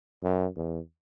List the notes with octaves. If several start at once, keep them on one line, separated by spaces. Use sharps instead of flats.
F#2
E2